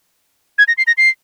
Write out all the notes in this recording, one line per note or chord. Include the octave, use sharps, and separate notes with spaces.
G#6
A#6
C7
A#6
C7